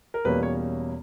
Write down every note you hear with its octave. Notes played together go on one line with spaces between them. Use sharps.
A#4
E2 B2 G3 A#3 C#4 B4
C#5